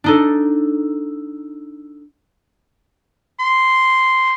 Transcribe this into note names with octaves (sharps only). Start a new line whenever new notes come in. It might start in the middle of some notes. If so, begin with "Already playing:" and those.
D4 D#4 A4
C6